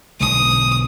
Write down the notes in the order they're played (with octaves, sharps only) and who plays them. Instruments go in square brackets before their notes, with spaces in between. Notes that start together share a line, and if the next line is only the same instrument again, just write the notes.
[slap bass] B1 D3 [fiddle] D#6